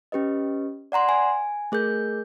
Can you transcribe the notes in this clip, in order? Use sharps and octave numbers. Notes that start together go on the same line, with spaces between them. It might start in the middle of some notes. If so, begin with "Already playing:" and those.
C#4 G4 B4 D#5
D5 F#5 A#5 C6
G#5
A3 G#4 A#4 G6